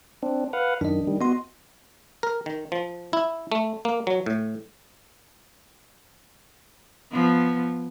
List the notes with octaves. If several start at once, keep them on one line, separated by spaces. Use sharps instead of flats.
C4 D4
B4 F5 F#5
F#2 D#3 D4 D#5
D#3 G3
B3 F#4 D#5 C6
A#4
D#3
F3
E4
A3
A#3
F#3
A2
F3 B3